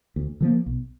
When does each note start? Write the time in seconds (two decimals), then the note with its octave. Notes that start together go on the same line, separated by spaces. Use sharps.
0.16 D2
0.41 D3 F3 A#3
0.66 B1